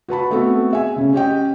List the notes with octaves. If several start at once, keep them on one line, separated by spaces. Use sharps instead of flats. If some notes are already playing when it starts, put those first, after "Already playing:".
F#4 B4 A5 B5
A3 B3 C4 F#4 A4
G#4 E5 G#5
C#3 C#4
C#4 G4 D#5 G5